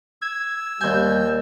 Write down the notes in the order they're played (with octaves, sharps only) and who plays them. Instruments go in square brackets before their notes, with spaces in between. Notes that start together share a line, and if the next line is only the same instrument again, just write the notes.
[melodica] E6 [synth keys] G#6
[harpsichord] D#2 G#5 [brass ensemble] G3 [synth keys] G6